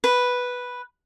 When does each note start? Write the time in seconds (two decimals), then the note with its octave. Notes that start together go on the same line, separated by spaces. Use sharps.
0.04 B4